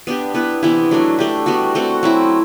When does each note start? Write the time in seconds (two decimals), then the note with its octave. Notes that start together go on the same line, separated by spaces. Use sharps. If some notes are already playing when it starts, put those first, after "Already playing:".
0.07 B3 D4 G4
0.34 B3 E4 B4
0.63 C3 E3 B3 E4
0.91 F#3 A3 D4
1.19 A3 D4 G4
1.46 G3 B3 F#4
1.75 A3 C4 F#4
2.03 F#3 C4 E4